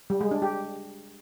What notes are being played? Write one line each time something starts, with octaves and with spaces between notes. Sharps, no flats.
G3
G#3
D4
G4